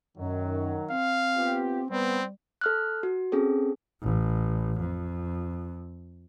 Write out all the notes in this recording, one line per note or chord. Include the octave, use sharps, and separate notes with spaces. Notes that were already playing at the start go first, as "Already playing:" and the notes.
F#2 D#3 F#3
C4 F5
B3 F4 G4
G3 B3 C4
A4 F6 F#6
F#4
C4 C#4 G#4 A4
A1
F2